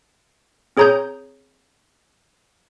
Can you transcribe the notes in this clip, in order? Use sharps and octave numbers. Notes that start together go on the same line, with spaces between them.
C4 G#4 C#5 A#5 D#6 G6